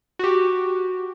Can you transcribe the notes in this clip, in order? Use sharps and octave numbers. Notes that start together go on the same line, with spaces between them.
F#4 G4